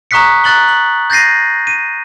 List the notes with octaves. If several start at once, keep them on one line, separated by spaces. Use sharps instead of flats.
A#5 C#6 D#6 F#6 B6 C#7
A#5 F#6 A6 F#7 G7
F#7
G6 A6 A#6 C7 D#7
D#7